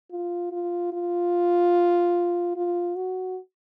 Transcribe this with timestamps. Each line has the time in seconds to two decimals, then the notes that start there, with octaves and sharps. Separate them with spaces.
0.11 F4
0.52 F4
0.93 F4
2.56 F4
2.96 F#4